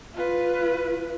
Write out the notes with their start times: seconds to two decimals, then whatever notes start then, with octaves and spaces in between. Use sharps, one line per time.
0.14 F4 B4